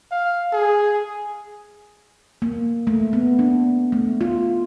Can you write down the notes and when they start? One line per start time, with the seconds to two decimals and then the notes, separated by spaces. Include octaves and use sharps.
0.11 F5
0.53 G#4
2.42 A#3
2.87 A3
3.13 B3
3.39 D4
3.92 A3
4.21 F4